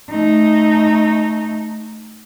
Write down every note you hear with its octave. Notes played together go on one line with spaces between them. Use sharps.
A3 D#4